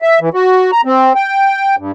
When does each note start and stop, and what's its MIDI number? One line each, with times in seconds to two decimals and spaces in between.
0.02 0.19 76
0.21 0.29 52
0.34 0.71 66
0.72 0.81 82
0.85 1.13 60
1.15 1.76 79
1.78 1.92 43